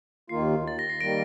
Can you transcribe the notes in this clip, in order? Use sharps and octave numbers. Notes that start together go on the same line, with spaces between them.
D#2 D#3 A#3 F4 C7
A6
A#6
C7
D#3 G3 A#3 A#6 D7